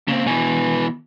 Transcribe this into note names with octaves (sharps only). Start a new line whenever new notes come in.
C#3 A#3 C4
B2 E3 B4 G#5